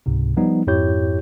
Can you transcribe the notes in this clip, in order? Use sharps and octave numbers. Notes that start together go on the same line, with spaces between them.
C#2 G#2 C3
F3 G3 B3 D#4
F2 G#2 E4 G4 C#5 G6